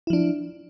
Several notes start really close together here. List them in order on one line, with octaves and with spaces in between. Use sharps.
E4 F3 D4